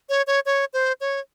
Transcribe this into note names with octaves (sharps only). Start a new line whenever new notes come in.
C#5
C#5
C#5
C5
C#5